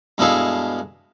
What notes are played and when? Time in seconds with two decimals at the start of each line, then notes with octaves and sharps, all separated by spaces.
0.18 G2 B2 G#3 E4 A4 F5